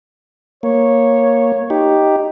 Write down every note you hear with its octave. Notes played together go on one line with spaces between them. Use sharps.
A#3 C#5
D#4 G4